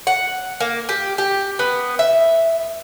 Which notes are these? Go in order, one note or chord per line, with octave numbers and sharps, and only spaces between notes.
F#5
A#3
G4
G4
B3
E5